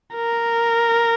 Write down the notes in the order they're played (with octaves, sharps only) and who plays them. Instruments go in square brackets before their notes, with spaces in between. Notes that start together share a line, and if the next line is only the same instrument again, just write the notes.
[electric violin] A#4